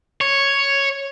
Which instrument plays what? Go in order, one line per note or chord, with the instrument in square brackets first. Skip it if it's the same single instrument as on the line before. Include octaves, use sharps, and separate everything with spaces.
[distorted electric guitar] C#5